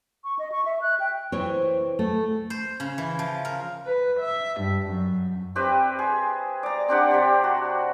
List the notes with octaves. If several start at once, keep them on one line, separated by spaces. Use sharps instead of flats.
C#6
D#5
C#6
E5
F#6
G5
C3 E3 C4 C#5
A3
C5
C#3
E3
F3
A#4
B4
E5
G2
F#2
C4 G4 B4 E5
G#4
D5 A#5
C4 D4 G4 F#5
C3 G4
F#4